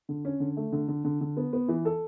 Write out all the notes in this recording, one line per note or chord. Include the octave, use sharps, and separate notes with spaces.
D3
C#4
D3
A3
D3
D3
D3
D3
B3
B3
E3
A4